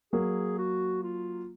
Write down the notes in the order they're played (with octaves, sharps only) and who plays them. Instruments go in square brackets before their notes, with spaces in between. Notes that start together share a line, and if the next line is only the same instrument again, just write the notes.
[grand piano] F#3 A#3 [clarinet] G#4
[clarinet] F#4
F4